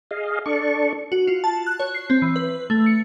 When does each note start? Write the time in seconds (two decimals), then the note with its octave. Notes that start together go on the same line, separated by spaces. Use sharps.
0.11 G#4 D#5 F5
0.46 D4 A4 D5 C#6
1.12 F#4
1.27 F4
1.44 A5
1.67 F#6
1.80 C#5
1.95 C7
2.10 C4
2.22 E3
2.36 B4
2.70 A3
2.86 C#7